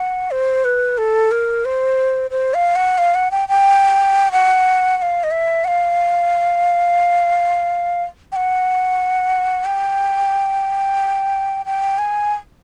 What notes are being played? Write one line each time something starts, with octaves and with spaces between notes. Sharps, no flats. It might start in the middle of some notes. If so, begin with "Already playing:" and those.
Already playing: F#5
C5
B4
A4
A#4
C5
C5
F5
F#5
F5
F#5
G5
G5
F#5
F#5
F5
D#5
E5
F#5
F5
G5
F#5
G5
G5
G#5